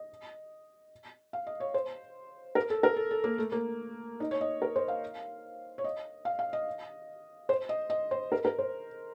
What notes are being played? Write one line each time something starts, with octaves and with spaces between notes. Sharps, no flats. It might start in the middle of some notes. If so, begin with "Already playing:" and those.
Already playing: D#5
F5
D#5
C#5
C5
A#4
A4
A#4
A4
A4
A#3
A3
A#3
D#4
C#5
D#5
A#4
C5
F5
C#5
D#5
F5
F5
D#5
C5
D#5
D#5
C5
A#4
A#4
C5